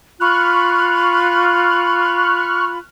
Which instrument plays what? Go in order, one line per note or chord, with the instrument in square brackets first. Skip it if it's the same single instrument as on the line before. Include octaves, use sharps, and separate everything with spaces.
[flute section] F4 B5 [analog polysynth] C#6 F6 F#6